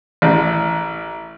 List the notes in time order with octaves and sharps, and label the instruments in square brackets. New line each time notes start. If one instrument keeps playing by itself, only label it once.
[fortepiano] A1